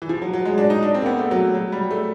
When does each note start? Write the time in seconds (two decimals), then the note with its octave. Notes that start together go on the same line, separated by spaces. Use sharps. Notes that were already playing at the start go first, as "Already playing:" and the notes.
0.02 E3
0.09 F3
0.22 F#3
0.33 F#3
0.45 G#3
0.58 D4
0.70 D#4
0.83 D4
0.94 C4
1.02 A#3
1.06 B3
1.18 A3
1.31 F#3
1.55 F#3
1.72 G3
1.91 A3